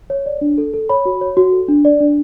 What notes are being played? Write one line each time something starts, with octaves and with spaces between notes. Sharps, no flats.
C#5
D5
D4
A4
A4
C#5 B5
F#4
C#5
F#4
A4
D4
D5
D4